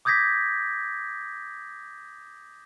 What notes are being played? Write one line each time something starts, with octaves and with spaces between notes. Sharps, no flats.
D6 D#6 G6 G#6 A#6 B6